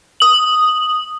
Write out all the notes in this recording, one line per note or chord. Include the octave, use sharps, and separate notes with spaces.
D#6 F#7